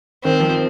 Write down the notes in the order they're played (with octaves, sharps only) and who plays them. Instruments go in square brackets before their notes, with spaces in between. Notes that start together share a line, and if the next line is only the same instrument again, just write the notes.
[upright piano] D#3 [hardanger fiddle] C4
[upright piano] F3